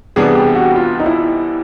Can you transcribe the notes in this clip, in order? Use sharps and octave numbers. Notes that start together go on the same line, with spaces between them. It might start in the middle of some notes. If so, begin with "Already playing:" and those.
C3 E3 G3 B3 D4 G#4
G4
F#4
F4
D#4
E4